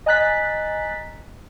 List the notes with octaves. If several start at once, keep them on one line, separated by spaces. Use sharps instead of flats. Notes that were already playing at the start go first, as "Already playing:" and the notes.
D#5 G#5 A#5 F#6 A6 B6